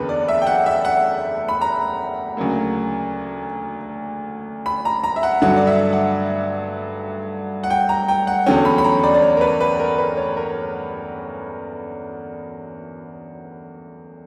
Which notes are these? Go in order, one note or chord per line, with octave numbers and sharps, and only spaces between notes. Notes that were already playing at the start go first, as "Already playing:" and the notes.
Already playing: F#1 E2 D3 A#4 B4
D5
E5
G5
F#5
E5
F#5
B5
A#5
D2 C#3 F#3 A#3
B5
A#5
A#5
E5
F#5
G2 D3 F#3 F#5
D5
E5
F#5
F#5
G5
A#5
G5
F#5
E2 D3 F#3 C#4 G5
B5
B5
A#5
D5
D5
C#5
A#4
B4
B4
A#4
B4
C#5
A#4